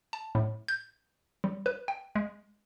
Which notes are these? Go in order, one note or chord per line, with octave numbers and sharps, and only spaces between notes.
A5
A2
G6
G3
B4
G5
G#3